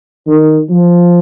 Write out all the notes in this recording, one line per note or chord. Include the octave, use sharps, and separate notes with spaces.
D#3
F3